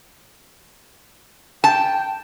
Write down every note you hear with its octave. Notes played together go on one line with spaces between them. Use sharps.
G5 A5